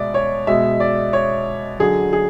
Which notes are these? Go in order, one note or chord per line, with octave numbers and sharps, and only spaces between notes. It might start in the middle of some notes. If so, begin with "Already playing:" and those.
Already playing: B2 G#3 D5 E5
C#5
B2 G#3 E5
D5
C#5
D3 F#3 G#4
G#4